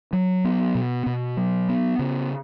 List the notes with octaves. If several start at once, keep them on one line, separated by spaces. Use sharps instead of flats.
F#3
B3
B2
B2
F#3
B3
C#3